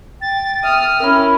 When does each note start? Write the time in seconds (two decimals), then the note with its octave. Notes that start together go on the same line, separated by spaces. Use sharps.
0.22 G5 A6
0.64 E5 D#6 F6
1.00 C#4 E4 A#4 E5 B5